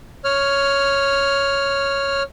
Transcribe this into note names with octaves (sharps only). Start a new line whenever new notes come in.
C#5 F6